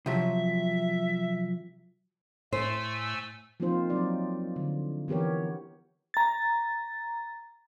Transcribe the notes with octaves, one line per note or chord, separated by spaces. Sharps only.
C3 F3 F#3 E5
A2 A3 C5 G#5 E6
F3 A#3 C4 D#4 F4 C5
F3 F#3 C4 D#4 D5
D3
E3 B3 G4 A#4 C#5
A#5 A6